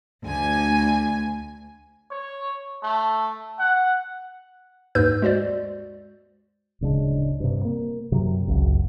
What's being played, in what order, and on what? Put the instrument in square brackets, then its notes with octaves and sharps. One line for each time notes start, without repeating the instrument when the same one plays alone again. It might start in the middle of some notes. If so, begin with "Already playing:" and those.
[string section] D2 G#5
[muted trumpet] C#5
A3
F#5
[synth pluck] D#2 G#2 B4 E6 G6
G#3 F#4 C5 D5
[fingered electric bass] D1 C#3 G#3 D4
G2 C3
A#3
F#2 C3 F#3
G#1 C#2 F#2